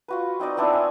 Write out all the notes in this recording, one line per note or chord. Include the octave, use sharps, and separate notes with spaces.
F4 F#4 B4
C4 D#4 D5 D#5
B3 C4 D4 E4
G#5